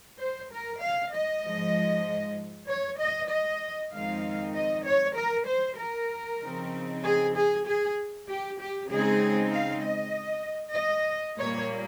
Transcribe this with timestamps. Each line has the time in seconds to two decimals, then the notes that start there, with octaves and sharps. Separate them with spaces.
0.19 C5
0.51 A#4
0.81 F5
1.13 D#5
1.44 G#2 F3 G#3
2.68 C#5
3.00 D#5
3.31 D#5
3.92 F2 D#3 G#3 C4 D#4 F5
4.55 D#5
4.85 C#5
5.17 A#4
5.48 C5
5.80 A#4
6.41 C#3 F3 C4 D#4
7.04 G#4
7.35 G#4
7.66 G#4
8.28 G4
8.60 G4
8.90 C#3 G#3 C4 D#4 G#4
9.52 F5
9.83 D#5
10.76 D#5
11.39 A#2 G3 A#3 C#5